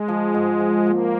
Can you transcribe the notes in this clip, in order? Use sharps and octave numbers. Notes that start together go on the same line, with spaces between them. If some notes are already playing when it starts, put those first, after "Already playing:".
Already playing: G#3
F3
G#2
F3
F3 A#3